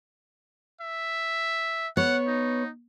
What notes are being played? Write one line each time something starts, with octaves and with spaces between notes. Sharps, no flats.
E5
B3 C#5 F#5
D#4